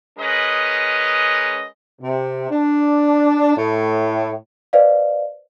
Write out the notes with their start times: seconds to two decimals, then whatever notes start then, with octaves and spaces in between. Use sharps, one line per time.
0.19 G#3 C#4 A#4 B4 D#5
2.01 C3
2.51 D4
3.57 A2
4.73 B4 C5 D5 D#5 F5